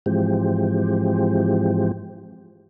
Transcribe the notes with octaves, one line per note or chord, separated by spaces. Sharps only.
G#2 E3 F3 G#3 C4 G4